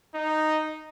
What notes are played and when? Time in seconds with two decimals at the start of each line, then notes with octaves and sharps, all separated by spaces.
0.14 D#4